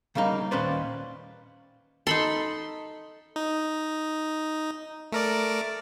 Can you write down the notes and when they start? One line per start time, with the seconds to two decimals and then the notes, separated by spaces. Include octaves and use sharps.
0.15 C#3 G3 A#3 D#4
0.51 D#2 A#2 C#4 B4 C5 D5
2.07 D#4 A4 B5 C6
3.36 D#4
5.12 A3 A#4 D5